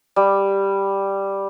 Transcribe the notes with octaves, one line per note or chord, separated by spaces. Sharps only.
G3